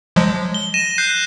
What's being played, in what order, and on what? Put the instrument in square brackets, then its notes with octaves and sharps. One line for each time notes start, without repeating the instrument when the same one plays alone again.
[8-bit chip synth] F3 F#3 G#3
[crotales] G7
A#6 D#7 E7
F#6 G6 C7